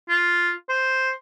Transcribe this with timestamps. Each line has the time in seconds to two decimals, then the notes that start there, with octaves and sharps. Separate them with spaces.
0.09 F4
0.69 C5